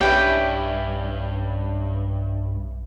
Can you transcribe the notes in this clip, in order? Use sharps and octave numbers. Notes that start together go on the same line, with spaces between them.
B1 G2 C#4 E4 G4 B4 G5